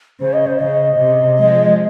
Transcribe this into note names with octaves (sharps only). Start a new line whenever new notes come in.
C#3 C5
D#5
C5
C#3 D#5
C3
F3 G#3